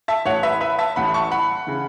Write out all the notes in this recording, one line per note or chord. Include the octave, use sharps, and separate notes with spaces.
E5 A5
A1 A2 E3 C#5 F#5
B4 E5
B4 E5
E5 A5
A1 A2 E3 F#5 B5
A5 C#6
F#5 B5
C#3 E3